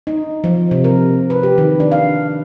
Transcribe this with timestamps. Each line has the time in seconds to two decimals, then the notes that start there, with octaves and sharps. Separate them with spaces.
0.07 D#4
0.44 F3
0.71 C3
0.84 A#4
1.30 B4
1.43 G4
1.58 D#3
1.80 D4
1.92 F5